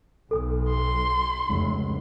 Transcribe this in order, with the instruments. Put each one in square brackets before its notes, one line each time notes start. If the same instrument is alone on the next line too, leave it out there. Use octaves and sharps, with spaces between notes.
[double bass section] B1 [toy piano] A4 G#5 D#6
[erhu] C6
[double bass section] F1 [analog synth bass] C#2